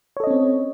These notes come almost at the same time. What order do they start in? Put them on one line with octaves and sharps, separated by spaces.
C#5 A4 D#5 C#4 C4